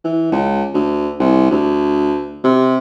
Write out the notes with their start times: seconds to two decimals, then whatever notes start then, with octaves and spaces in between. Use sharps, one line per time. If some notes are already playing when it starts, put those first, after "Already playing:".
0.04 E3
0.32 C#2
0.74 D2
1.19 C2
1.51 D2
2.44 C3